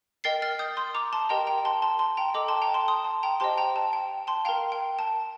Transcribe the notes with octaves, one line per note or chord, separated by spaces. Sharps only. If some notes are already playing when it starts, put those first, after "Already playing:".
A#4 D#5 G5 A6 C7
F6 A6
D#6 G6
C6 D#6
A#5 D6
A5 C6
G4 A#4 D#5 G5 A#5
G5 A#5
A5 C6
A5 C6
A5 C6
G5 A#5
A4 D#5 G5 A#5 D6
A5 C6
G5 A#5
A5 C6
C6 D#6
A5
G5 A#5
G4 C5 D#5 A5 C6
G5 A#5
A5
G5
A5 C6
A#4 F5 G5 A#5
G5
A5